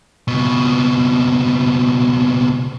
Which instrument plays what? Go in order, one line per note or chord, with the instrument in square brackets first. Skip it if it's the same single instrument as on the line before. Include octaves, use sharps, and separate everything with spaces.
[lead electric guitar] C#2 B2